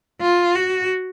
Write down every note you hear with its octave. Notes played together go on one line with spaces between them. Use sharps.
F4
F#4